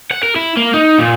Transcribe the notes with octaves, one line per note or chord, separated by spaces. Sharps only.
F#5
A#4
E4
A#3
D#4
A#2